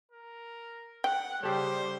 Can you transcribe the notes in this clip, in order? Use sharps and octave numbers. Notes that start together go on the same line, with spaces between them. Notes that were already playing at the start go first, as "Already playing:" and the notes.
A#4
F#5 G5
C#3 G3 G4 A4 C5